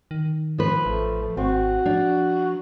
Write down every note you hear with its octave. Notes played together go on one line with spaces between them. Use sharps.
D#3
F3 B4
A1 A3
G#1 C4 F#4
F3 D4